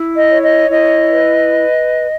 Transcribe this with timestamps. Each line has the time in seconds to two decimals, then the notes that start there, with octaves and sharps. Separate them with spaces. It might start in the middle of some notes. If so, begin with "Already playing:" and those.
Already playing: E4
0.15 D#5
0.29 C#5
0.42 D#5
0.69 E4 D#5
1.10 B4